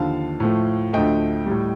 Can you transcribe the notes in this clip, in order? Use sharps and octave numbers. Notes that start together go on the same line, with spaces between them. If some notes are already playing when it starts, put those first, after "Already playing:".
Already playing: D#2 D3 F3 F5 A5
A2 F3 A3
D2 D3 F3 A3 D#5 G5
A2 G3